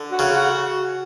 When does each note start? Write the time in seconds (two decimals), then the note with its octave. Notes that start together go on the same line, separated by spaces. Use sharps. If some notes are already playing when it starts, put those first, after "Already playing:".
Already playing: D3
0.11 F#4
0.19 C#3
0.35 F#4